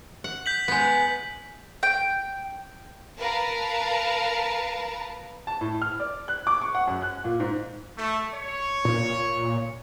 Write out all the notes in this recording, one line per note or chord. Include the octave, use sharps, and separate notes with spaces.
F#5
G6 B6 F#7
G#3 B3 B6
G5
A#4 B4 F5 A5 A#5
A5
A2
F6
D5
F#6
D6
C#6
F#5
F#2
F#6
A#2
G#2
A3
C#5
A#2